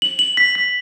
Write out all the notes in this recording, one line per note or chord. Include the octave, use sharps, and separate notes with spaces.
F#7
F#7
B6
B6